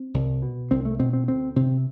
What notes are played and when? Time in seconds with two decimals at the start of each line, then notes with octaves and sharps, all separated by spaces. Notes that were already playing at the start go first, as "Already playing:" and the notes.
Already playing: C4
0.14 C2
0.42 B2
0.71 C2 C4
0.85 A3
0.99 B2 C4
1.13 C4
1.28 D2 C4
1.56 C3 C4